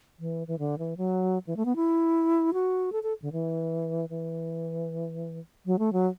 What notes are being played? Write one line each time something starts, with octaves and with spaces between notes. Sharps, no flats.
E3
E3
D3
E3
F#3
E3
A3
B3
E4
F#4
A4
A4
D3
E3
E3
F#3
A3
F#3